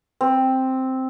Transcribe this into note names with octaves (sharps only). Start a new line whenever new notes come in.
C4